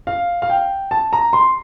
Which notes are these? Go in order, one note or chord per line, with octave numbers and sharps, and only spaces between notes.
F5
F5
G5
A5
A#5
C6